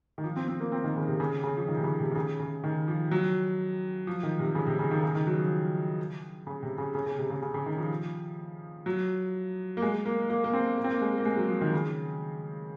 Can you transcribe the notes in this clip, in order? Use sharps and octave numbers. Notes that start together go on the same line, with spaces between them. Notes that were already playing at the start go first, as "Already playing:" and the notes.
D#3
F3
C4
C4
A#3
C4
D#3
C#3
C3
C#3
C#3
F3
D#3
C3
C#3
C3
D#3
C#3
C#3
D#3
F3
F#3
F3
D#3
C3
C#3
C3
C#3
D#3
C#3
D#3
F#3
F3
C#3
C3
C#3
C#3
C#3
C3
C#3
C#3
C#3
D#3
F3
F#3
A#3
G#3
A#3
A#3
A#3
C4
A#3
C4
A#3
G#3
A#3
G#3
F#3
F3
D#3
C#3